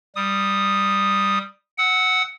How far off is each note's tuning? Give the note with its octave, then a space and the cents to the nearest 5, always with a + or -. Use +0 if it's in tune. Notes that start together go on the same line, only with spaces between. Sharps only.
G3 +0 D#6 -5
F#5 +5 E6 -30